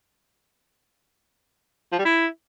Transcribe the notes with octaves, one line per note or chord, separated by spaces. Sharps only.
F3
G3
E4